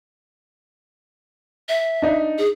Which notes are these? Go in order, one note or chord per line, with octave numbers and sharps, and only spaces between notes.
E5
D4 D#4
G#4